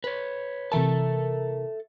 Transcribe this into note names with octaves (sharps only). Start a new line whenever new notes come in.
B4 C#5
C3 E3 A4 A#4 E5 A5